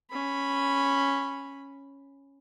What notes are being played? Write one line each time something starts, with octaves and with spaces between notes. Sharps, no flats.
C#4 B5